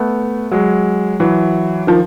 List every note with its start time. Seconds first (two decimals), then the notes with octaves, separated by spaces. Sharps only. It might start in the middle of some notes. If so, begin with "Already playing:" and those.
Already playing: A3 B3
0.51 F#3 G#3
1.20 E3 F#3
1.87 D#3 F3